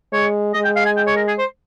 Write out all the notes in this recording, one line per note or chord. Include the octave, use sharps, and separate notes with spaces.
G#3 C#5
G#3 D#5
G5
F5
G#5
G5
C#5
A#4
G#4
C5